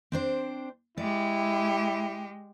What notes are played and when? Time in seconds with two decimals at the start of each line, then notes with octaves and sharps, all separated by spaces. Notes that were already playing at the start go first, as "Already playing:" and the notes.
0.12 C4 D4 C5
0.97 G#3 E4 G4 D5